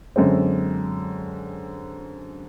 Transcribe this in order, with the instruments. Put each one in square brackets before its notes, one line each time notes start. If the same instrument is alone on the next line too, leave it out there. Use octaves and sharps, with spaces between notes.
[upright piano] F#2 D3 G#3 C4